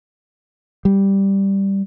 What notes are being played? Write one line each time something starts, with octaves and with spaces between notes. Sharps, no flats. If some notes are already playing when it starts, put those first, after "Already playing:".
G3